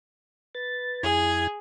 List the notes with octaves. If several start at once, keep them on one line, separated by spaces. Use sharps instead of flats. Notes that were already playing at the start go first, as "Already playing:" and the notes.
B4 A6
F2 E4 G#4 G#6